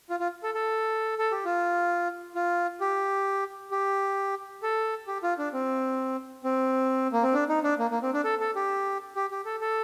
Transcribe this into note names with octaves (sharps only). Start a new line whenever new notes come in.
F4
F4
A4
A4
A4
G4
F4
F4
G4
G4
A4
G4
F4
D4
C4
C4
A#3
C4
D4
D#4
D4
A#3
A#3
C4
D4
A4
A4
G4
G4
G4
A4
A4